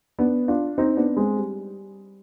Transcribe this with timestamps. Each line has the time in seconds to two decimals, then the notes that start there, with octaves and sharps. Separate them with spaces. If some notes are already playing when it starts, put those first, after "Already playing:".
0.19 B3 D4
0.48 D4 F4
0.78 C4 D#4
0.97 B3 D4
1.17 G#3 C4
1.37 G3